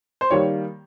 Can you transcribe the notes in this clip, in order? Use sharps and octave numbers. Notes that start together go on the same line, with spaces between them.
C5
D#3 G3 A#3 C#5